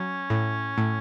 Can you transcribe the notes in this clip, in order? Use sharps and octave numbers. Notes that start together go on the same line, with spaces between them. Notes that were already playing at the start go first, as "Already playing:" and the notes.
Already playing: F#3 C#4
A2
A2